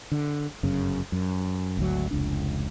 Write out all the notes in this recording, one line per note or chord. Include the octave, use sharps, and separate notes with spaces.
D3
G1 F#2 C#3
F#2
G#1 D2 F#3
F1 C#2 D4